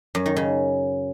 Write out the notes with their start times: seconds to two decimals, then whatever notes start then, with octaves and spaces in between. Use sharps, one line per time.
0.15 F#2
0.26 D#3
0.36 C#3